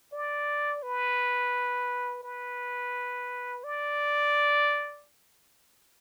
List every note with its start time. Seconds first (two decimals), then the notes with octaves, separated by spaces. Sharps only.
0.13 D5
0.83 B4
2.23 B4
3.64 D5